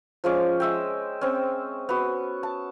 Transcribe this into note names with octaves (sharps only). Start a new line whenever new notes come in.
F3 G#3 C#4 D5
G#3 E5 G5
C4 C#4
B3 F#4
A5